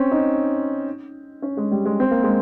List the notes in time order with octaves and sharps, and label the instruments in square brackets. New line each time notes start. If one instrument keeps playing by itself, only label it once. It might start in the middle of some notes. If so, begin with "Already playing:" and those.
Already playing: [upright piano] C4 C#4
D#4
C#4
G#3
G3
G#3
C4
A#3
G#3